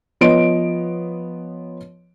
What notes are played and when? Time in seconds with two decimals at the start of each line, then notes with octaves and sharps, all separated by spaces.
0.21 F3 B3 C#5 D#5 C6 D7